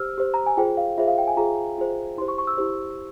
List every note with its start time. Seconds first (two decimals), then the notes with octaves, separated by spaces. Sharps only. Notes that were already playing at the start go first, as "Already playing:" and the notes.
Already playing: G4 C5 E6 F6
0.18 G4 C5
0.34 A#5
0.46 G#5
0.57 F4 G#4 C5 G5
0.77 F5
0.98 F4 G#4 C5 E5
1.08 F5
1.18 G5
1.27 G#5
1.37 F4 G#4 C5 A#5
1.78 F4 G#4 C5
2.18 E4 G4 C5 C6
2.28 C#6
2.38 C#6
2.47 E6
2.58 E4 G4 C5